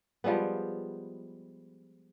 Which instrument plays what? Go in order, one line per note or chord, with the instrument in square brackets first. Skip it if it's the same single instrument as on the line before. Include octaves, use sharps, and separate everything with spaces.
[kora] F3 G3 G#3 B3